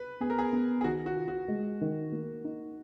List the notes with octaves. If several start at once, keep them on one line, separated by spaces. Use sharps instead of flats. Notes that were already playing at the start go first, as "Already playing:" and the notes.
Already playing: B4
B3 G#4
A#4
G#4
B3
G#4
D#3 F#4
F#4
F4
F#4
G#3
D#3
A#3
D#4